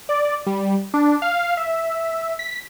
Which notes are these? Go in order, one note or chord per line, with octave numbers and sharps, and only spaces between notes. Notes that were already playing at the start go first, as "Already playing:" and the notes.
D5
G3
D4
F5
E5
B6